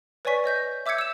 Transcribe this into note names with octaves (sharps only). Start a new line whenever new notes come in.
B4 C#5 D5 G#5 C#6 B6
C#5 D#5 G6 A#6
E5 D6 E6 G6 G#6 C#7
E6 E7